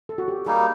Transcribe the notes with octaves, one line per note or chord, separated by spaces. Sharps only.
A4
F#4
G4
G3 A#3 D#4 G#4